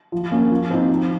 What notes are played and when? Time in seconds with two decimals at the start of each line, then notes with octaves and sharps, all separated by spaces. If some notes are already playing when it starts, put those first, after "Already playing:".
0.12 F3
0.31 A#3 C#4
0.51 F3
0.70 C4 D#4
0.90 F3